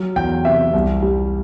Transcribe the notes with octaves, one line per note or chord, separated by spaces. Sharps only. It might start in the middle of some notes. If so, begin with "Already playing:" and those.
Already playing: F#3
E2 G5
C3 E5
C2
G3